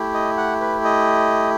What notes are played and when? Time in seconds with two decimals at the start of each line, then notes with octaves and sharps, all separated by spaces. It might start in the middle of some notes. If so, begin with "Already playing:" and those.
Already playing: A3 E4 G4
0.14 D#5
0.37 F#5
0.61 B4
0.84 D#5